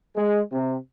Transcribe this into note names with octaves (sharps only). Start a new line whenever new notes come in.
G#3
C3